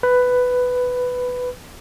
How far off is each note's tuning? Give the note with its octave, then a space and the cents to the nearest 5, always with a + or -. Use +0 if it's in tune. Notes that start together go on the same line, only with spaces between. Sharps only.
B4 +10